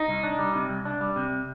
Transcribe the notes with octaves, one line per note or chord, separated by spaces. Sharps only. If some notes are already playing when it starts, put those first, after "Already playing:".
Already playing: D#4
C2
D4
G3
C3
C2
D4
G3
C3